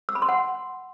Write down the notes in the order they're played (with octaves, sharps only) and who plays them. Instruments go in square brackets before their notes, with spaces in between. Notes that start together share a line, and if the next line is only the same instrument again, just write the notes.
[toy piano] E6
B5
C6
F#5